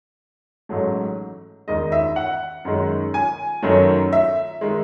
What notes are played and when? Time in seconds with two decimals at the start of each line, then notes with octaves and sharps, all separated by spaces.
0.69 A1 G#2 F#3 A3
1.67 E1 D#2 D#3 G#3 D#5
1.92 E5
2.16 F#5
2.65 F#2 D#3 G#3
3.14 G#5
3.63 F#2 D#3 F#3 A3
4.13 E5
4.61 D#3 G#3